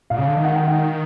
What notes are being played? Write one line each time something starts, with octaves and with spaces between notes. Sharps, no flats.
A#2 F5
C#3
D3
D#3
F#5
G5
F#5